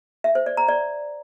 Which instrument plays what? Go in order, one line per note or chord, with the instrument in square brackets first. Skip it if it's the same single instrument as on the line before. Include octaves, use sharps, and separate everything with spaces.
[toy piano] E5
C5
D5
A#5
D5